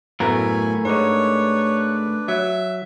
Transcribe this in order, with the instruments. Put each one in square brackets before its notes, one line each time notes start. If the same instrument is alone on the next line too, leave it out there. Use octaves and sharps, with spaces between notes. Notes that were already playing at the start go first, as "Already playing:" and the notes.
[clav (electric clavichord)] F#2 A2 B3 [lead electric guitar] A3 A#4 [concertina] G#5 B5 C#6
[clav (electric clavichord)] G#2 G#3 [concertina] D4 B4 [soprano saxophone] C#5
[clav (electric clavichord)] F#3 [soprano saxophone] E5